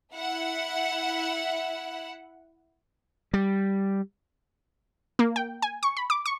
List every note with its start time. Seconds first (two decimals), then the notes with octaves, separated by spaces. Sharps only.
0.12 E4 F#5
3.34 G3
5.19 A#3
5.36 G5
5.62 G#5
5.83 C#6
5.97 B5
6.10 D6
6.26 C#6